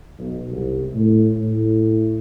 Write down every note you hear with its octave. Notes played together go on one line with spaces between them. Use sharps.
B1
C2
A2
A2